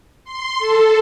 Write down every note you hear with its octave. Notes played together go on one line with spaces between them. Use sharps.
C6
A4